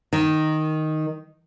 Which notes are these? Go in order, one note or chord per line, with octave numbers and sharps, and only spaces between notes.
D#3